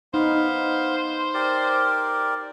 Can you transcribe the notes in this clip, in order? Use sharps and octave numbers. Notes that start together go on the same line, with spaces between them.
B3 D#4 C5 F5
G4 A#4 D5